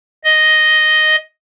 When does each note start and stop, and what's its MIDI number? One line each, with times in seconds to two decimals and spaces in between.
0.25 1.16 75